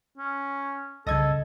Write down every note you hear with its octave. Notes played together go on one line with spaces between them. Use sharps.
C#4
C2 C#3 A4 D#5 G#6